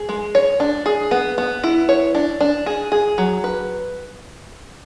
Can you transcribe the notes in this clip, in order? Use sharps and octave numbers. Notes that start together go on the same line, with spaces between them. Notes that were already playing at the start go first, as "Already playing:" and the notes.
Already playing: G#4
G#3
C#5
D4
G#4
B3
B3
E4
C#5
D4
D4
G#4
G#4
F#3
B4